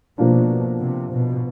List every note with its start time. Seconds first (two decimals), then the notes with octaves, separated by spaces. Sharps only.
0.18 B2 F3 A#3 D4
0.80 C3
1.12 B2